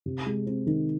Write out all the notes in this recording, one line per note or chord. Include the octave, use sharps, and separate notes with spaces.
C3
G#3
C4
D#3